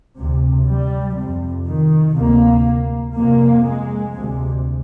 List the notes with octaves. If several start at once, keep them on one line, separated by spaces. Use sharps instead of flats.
D2 C3
G3
F2 C3
D#3
D2 C3 A#3
F2 C3 A#3
G#3
D2 C3